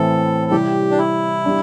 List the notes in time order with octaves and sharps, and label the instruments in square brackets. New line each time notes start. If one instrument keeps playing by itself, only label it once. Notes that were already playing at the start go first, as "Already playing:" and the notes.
Already playing: [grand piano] A2 E3 C4 E4 [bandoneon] A4
[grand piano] C3 G3 E4 [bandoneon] G4
[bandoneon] D4
E4
[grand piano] G3 D4